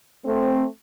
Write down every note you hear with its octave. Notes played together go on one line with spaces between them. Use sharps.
A3 C4